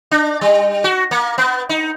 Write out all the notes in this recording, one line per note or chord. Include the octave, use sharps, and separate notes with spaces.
D4
G3
F#4
A#3
B3
D#4